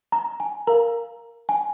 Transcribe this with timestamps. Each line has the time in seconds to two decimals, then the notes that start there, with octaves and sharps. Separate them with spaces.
0.12 A#5
0.40 G#5
0.67 A#4 F5 A#5
1.49 G#5